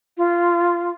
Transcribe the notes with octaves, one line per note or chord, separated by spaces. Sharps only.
F4